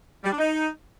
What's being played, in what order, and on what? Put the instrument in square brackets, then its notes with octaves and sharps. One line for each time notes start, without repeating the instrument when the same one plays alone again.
[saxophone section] G3
D4
D#4